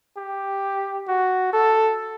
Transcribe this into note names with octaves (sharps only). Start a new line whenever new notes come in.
G4
F#4
A4